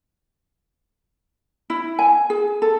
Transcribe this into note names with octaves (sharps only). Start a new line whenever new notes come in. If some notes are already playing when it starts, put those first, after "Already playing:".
E4
G#5
G#4
A4